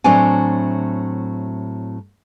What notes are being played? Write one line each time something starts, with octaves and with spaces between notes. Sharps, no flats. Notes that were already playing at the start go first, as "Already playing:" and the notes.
A2 F#3 C4 D4 G#5